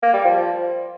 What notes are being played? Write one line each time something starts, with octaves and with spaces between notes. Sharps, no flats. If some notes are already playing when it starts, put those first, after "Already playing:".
A#3
G3
F3